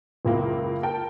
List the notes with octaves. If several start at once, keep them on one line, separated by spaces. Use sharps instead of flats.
F#1 C#2 A#3 E4
A#4 G5 A5